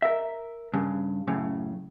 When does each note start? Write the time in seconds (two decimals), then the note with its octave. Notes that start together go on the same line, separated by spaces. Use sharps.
0.02 A#4 E5
0.74 G2 C#3
1.27 F#2 A2 C#3